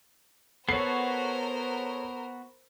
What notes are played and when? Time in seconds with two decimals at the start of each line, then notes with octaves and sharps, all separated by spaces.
0.69 B3 F#4 A4 A#4 C5 C#5 C7